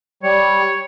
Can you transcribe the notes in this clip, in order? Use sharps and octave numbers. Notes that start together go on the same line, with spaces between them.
G3 C#5